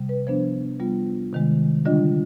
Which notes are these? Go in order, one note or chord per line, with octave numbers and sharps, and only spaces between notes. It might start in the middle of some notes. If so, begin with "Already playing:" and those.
Already playing: C3 G3
B4
F3 B3 D4 C5
G3 B3 F4
C3 D#3 G#3
D3 G3 D4 F4 D#5